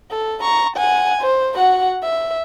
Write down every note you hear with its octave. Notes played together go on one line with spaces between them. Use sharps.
A4
A#5 C#6
F#5 G#5
C5
F#4 F#5
E5